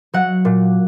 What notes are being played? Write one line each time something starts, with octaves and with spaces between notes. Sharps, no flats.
F#3 F#5
A#2